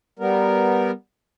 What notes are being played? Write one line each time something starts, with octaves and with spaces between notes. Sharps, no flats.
G3 B3 A#4